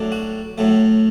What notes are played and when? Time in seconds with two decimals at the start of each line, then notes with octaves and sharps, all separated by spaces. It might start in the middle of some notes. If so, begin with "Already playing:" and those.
Already playing: A2 F#3 A3 D4
0.12 F#4
0.58 A2 F#3 A3